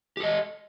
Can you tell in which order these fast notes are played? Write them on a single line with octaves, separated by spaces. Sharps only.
G4 A4 D#5